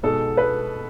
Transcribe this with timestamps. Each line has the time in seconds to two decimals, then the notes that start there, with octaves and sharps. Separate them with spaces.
0.03 B2 G#3 B3 D#4 A4
0.37 B4